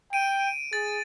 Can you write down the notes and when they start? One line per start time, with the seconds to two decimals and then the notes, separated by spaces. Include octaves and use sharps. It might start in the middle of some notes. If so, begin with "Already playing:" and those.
0.13 G5 D7 D#7
0.73 G#4 A6